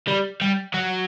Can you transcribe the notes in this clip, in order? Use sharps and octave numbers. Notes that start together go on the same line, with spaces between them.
G3
G3
F#3